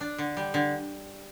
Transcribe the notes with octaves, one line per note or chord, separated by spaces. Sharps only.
D4
D3
G3
D3